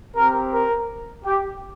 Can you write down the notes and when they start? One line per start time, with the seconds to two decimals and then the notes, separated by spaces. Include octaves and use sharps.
0.14 C4 G4 A#4
0.51 A#4
1.23 G4